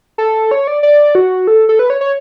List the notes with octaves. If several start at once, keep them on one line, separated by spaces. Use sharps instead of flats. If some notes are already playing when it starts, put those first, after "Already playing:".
A4
C#5
D5
D5
F#4
A4
A4
B4
C#5
C#5